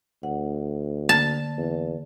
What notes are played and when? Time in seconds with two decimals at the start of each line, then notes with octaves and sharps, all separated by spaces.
0.23 D2 F#5
1.09 D3 A#3 A5
1.58 E2